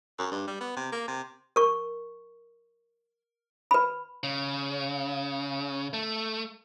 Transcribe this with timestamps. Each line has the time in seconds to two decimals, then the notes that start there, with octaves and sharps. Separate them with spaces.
0.19 F#2
0.32 G2
0.47 G3
0.60 B3
0.76 C3
0.92 A#3
1.08 C3
1.56 A#4 C#6
3.71 B4 B5
4.24 C#3
5.93 A3